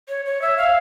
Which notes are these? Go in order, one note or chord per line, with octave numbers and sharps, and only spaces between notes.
C#5
C#5
E5
F5